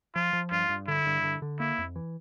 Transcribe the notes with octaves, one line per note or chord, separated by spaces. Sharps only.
F3 F4
F3
G2 F4
G2
D3 E4
G2
D3
D3
A#3 E4
F2
E3